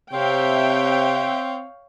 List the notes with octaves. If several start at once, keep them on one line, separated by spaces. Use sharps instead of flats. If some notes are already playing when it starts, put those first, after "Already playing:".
C3 C4 C#5 E5 F5 G5